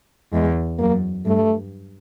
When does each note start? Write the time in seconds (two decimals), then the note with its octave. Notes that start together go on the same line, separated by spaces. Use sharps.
0.32 E2 G#3
0.79 F#2 A#3
1.25 G2 A3